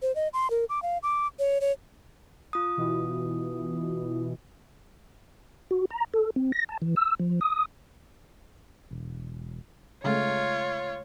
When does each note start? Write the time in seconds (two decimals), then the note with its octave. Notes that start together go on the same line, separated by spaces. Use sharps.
0.02 C5
0.15 D#5
0.33 C6
0.50 A#4
0.69 D6
0.83 F5
1.03 D6
1.39 C#5
1.61 C#5
2.53 F4 D#6
2.77 B2 E3
5.71 F#4
5.91 A#5
6.14 A4
6.36 C4
6.52 A#6
6.69 A5
6.82 E3
6.96 E6
7.19 F3
7.41 D#6
8.91 E1
10.04 C#3 G#3 A3 F4 C#5